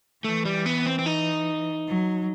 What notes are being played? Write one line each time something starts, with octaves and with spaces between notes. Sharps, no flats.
E3 A3
G3
B3
C4
C4
D#4
F#3